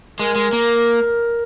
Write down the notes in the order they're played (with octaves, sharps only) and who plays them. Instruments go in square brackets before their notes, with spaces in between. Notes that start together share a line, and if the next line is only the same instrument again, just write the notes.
[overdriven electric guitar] G#3 [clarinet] A#4
[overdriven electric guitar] G#3
A#3